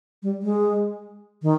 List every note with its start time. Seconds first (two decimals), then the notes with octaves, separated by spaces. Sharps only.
0.23 G3
0.42 G#3
1.42 D#3